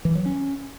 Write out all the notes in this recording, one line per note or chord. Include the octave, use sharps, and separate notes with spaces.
E3
F#3
C#4